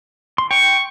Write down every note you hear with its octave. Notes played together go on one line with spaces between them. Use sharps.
C6
G5 C#6